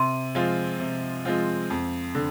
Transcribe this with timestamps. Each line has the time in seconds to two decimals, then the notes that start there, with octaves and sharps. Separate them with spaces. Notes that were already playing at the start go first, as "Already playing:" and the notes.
Already playing: C3 C6
0.35 F3 G#3 C4 F4
0.80 C3
1.25 F3 G#3 C4 F4
1.70 F2
2.15 D3